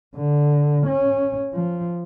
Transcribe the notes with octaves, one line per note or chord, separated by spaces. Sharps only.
D3
C#4
F3